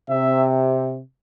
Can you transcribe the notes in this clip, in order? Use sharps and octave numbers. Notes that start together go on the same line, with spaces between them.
C3 E5